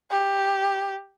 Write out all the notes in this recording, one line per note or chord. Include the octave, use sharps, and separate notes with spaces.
G4